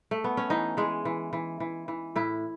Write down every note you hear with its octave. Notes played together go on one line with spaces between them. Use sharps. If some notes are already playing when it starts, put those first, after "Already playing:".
A3
B3
C#4
E3 D#4
E3 G#3
E3
E3
E3
E3
A2 E4